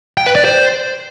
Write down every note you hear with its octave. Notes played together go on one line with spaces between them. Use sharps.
G5
B4
D5
C5